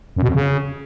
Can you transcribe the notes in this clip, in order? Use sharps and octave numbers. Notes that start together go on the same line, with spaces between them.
F#2
B2
F2
C#3